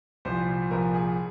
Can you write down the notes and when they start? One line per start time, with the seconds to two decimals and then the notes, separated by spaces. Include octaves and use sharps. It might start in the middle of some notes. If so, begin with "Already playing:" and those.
0.25 C2 A#2 F3 C5
0.71 C2 A#2 F3 A#4
0.94 G#4